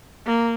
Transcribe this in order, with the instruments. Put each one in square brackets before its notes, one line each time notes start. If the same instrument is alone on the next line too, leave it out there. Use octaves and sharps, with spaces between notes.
[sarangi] A#3